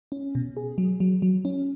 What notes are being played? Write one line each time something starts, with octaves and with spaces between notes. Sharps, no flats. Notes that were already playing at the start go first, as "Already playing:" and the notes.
C#4
B2
G#4
F#3
F#3
F#3
C#4